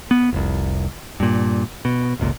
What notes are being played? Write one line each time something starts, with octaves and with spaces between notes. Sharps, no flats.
B3
F1 C2
G2 A#2
B2
G1 C#2 A#2